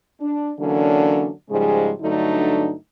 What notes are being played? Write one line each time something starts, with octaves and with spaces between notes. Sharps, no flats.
D4
D3 E3 F#3 A#3 C#4 D4
G#2 C#3 F3 G3 G#3
G2 D3 F#3 A3 D4 D#4